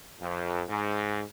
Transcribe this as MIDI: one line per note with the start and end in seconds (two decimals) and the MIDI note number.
0.20 0.62 41
0.68 1.22 44